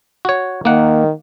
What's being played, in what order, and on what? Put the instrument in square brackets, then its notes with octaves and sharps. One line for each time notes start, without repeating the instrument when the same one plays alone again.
[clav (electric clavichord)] F#4 C#5
[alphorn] D#3 [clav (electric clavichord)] A#3 F#5